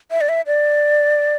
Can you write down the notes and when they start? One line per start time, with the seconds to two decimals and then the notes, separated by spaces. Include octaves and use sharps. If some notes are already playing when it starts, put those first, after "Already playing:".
0.11 E5
0.21 D5
0.29 E5
0.47 D5